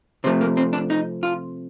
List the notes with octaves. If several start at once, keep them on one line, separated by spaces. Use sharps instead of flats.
C3 F3 A3 C4
A#3
C4
D4
D#4
F4